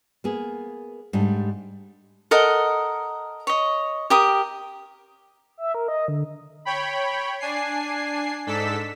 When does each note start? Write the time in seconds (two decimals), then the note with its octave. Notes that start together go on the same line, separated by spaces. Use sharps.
0.24 A#3 B3 G#4
1.13 G#2 G3 A3 D4
2.31 A4 A#4 D#5 F#5
3.47 C#5 D#5
4.10 G4 A#4 D#6
5.58 E5
5.75 A#4
5.88 D#5
6.08 D3
6.65 C#5 G5 B5
7.40 D4 G#5 C7
8.47 G#2 D4 A4 E6 B6